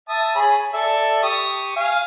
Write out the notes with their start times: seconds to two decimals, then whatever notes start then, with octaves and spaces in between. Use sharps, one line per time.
0.09 E5 A5 D#6
0.35 G#4 C#5 B5
0.74 A4 D5 E5
1.23 G4 C#6 D#6
1.76 F5 G#5